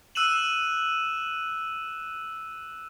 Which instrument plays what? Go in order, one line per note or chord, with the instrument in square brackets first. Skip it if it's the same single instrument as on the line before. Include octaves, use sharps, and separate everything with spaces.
[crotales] E6 F#6 D#7 E7 F#7